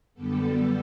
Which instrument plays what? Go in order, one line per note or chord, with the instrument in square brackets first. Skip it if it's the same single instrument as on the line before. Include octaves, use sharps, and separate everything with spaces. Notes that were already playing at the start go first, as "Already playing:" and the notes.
[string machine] F#2 D3 G3 B3 A4